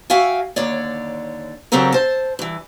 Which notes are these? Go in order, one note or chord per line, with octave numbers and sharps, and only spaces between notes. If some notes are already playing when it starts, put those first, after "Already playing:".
F#4 E5 F5 G5 G#5
D#2 D3 C#5 D5
C#3 F#3 C4 G4 A4 A#4
C5 A5
G2 E3